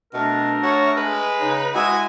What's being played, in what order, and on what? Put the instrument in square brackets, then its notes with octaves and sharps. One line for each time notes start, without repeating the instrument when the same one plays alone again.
[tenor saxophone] B2 [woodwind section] A3 D4 A#4
[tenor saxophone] F#4 [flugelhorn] C#5
[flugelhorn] G#3 [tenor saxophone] B4
[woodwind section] C#3 D#4
[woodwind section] G#3 E4 [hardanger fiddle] F#4 G#5 [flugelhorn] D#5